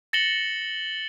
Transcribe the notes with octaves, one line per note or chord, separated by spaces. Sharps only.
A6 A#6 C#7 E7 F#7 G7